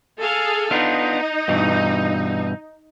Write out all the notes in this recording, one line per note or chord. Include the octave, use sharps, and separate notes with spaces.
G#4 A4 F5
B3 D4 D#4 F4
G2 B2 E3